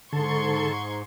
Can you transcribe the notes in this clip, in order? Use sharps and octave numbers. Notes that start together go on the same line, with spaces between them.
G#2 D3 A4 A5 C6 C#6 G#6